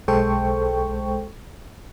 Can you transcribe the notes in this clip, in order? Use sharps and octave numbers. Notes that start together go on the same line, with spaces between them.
B1 G#3 A4 C5 G5 C#6